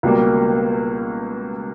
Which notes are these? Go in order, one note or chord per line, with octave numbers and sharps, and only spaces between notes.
C#2 B2 G3 A#3